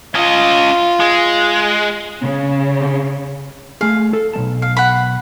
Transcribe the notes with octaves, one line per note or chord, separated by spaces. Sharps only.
C#4 F4 D#5
G#3
C#3
A3 G#4 F5
A4
B1 G#3 A5
F5
F#5 B5